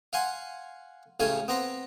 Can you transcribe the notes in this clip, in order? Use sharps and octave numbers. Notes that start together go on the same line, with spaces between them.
F5 F#5 G#5 C6
A1 C#3 A3 C#4 F5 G#5
B3 C4 A#5 C6